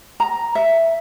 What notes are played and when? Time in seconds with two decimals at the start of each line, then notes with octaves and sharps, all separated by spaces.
0.20 A#5
0.55 E5